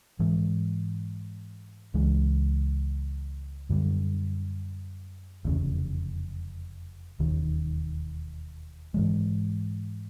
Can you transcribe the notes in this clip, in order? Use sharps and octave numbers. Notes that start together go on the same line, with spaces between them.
G#2 E3 G#3
C#2 C#3 E3 G#3
F#2 D3 G3
F1 E2 C#3
E1 D#2 D#3
G#2 E3 G#3